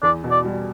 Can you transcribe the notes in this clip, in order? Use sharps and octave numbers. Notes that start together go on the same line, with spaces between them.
E2 D5
B2
D5
G3